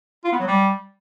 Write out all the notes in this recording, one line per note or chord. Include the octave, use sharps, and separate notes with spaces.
F4
B3
F#3
G3